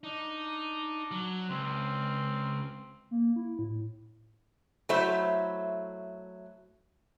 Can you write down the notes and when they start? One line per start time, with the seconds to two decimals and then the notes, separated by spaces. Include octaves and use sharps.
0.04 D4 D#4
1.11 F#3
1.50 C#2 C4
3.11 A#3
3.36 E4
3.59 A2
4.89 F#3 A3 E4 C5 E5